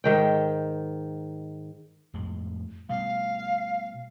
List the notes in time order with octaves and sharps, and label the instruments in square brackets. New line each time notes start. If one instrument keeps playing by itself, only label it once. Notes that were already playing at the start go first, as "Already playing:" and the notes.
[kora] G#2 D#3 G5
[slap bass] F2 A2 G#3
[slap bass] B2 G3 A3 [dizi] F5